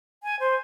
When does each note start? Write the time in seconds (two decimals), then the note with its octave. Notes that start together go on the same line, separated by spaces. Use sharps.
0.23 G#5
0.40 C5